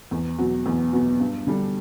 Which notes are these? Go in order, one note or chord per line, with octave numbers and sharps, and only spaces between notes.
E2
B2 F#3 B3 F#4
E2
B2 F#3 B3 F#4
G2
D3 G3 D4